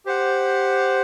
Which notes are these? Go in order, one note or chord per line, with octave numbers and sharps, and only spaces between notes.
G4 C5 F#5